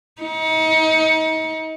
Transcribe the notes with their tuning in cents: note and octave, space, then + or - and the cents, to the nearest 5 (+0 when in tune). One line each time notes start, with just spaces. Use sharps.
D#4 +35